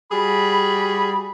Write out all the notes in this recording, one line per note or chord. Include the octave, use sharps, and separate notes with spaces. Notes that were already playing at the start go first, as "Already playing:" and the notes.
G3 F#4 G#4 B5